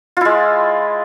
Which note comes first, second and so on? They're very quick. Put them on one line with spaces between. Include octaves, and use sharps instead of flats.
F4 E4 G#3